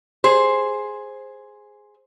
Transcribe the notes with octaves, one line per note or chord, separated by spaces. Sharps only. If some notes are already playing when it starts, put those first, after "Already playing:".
G#4 C5